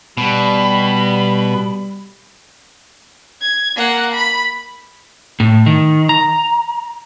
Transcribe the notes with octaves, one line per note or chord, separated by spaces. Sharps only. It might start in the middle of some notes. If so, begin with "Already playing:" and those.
B2 G3 B5
G#6
A#3 F#5
B5
A2
D#3
A#5